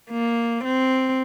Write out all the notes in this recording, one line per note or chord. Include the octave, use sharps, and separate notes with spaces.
A#3
C4